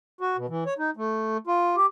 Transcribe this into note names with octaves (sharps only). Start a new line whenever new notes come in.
F#4
B2
E3
C#5
D#4
A3
F4
G4